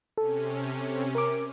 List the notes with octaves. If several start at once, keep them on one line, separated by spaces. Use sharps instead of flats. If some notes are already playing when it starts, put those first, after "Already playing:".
C3 C#4 A4
A#4 D6